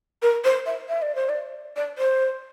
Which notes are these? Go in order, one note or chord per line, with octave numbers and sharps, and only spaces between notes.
A#4
C5
E5
E5
D5
C5
D5
D5
C5